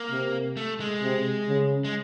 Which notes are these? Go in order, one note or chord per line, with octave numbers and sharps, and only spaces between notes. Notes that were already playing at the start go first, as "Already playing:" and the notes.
Already playing: A#3
C3
A3
G#3
C3
C#3
G#3